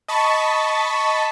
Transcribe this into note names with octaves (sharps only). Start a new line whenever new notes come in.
D#5 A5 B5 C#6